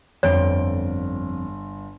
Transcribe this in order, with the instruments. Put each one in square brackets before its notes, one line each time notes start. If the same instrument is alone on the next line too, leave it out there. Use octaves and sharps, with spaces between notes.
[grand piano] G1 [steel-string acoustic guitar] F2 G5 [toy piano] C#5